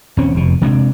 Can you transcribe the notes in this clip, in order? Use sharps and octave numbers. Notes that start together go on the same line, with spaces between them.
D#1 C4 C#4
F1 B2
C3 G#3 B3 D4